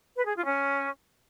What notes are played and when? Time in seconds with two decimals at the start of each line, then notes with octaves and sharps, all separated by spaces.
0.18 B4
0.27 G#4
0.35 F4
0.44 C#4